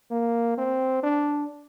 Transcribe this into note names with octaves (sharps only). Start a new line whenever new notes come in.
A#3
C4
D4